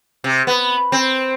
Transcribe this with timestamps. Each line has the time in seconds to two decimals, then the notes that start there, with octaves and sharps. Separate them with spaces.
0.24 C3
0.47 B3
0.92 C4